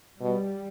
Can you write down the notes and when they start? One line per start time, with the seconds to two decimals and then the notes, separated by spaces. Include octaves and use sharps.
0.21 B2 G3